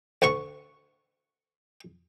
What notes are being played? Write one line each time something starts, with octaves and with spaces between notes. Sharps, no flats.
D2 F#5 C#6